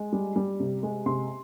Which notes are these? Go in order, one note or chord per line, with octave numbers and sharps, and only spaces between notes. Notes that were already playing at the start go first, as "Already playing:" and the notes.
Already playing: G#3
G3
G3
C3
G#3
C3 C6